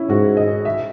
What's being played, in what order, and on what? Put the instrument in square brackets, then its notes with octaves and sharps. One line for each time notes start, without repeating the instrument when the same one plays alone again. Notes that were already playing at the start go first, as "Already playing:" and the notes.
Already playing: [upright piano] C#4 E4
[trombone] G#2 [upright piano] F#4
[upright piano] D#5
E5